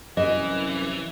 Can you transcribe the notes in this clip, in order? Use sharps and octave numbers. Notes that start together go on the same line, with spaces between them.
C2 F#2 E3 D#5